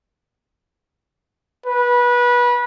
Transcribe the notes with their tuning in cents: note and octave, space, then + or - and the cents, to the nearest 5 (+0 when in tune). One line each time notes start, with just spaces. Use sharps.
B4 -25